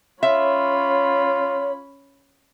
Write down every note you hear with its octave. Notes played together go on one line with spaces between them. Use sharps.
C#4 F4 C#5 E5 B5